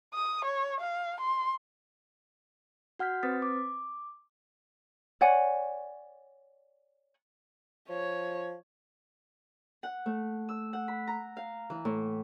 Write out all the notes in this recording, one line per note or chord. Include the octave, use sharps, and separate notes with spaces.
D#6
C#5
F5
C6
F#4 F#5 F6 G6 B6
C4 B4 C5 D#6 A6 B6
D6
C#5 D5 F#5 G#5
F3 C#5
F#5
A3
E6
F#5
B5
A#5
F5
E3
A2